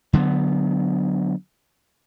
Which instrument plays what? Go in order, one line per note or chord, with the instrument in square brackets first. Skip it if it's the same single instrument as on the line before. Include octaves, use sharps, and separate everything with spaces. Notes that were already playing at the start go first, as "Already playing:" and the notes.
[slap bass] D3 F#3 G#3 B3